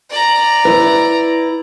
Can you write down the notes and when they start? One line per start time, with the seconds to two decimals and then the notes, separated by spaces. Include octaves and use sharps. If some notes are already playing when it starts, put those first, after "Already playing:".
0.11 D5 A#5
0.65 E4 B4